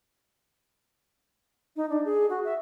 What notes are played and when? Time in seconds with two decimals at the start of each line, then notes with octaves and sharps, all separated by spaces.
1.76 D#4
1.89 D4
2.05 G#4
2.30 F#4
2.45 E5